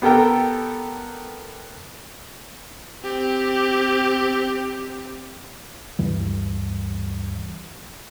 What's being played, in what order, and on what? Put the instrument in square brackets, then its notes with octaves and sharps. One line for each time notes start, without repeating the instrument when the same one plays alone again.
[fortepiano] B3 G4 A4 A#4 G5
[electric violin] C4 G4
[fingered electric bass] D2 G2 E3 G3